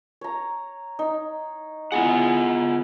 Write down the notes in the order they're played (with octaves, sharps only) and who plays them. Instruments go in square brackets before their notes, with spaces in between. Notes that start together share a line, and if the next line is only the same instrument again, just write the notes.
[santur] C#5 A#5
D#4
[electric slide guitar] B3 F4 F#5 [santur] E4 G#4